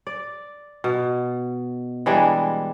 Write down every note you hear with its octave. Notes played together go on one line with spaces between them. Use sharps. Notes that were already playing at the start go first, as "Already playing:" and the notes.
D5
B2
E3 G3 G#3 D4